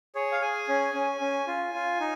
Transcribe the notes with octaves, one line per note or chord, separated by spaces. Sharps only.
G#4 C#5
F5
G#4 G#5
C#4
C#4
C#4
F4
F4
D#4